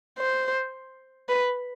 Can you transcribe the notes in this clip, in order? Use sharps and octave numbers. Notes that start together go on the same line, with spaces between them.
C5
B4